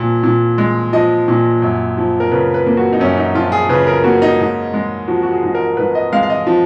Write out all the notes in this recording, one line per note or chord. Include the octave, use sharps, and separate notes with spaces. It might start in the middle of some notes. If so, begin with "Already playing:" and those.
Already playing: A#2 F3
A#2
G#3
F3 D#5
A#2
F#2
F3
A#4
C#3 B4
B4
A#3
F#4
D#4
F#2 C#4
D#4
F3 F4
G#4
C#3 B4
A#4
A#3 F#4
D#4
G#2
G#3
F3 F#4
F#4
G#4
G#2
A#4
G#2 B4
D#5
G#3 F5
F5
D#5
F3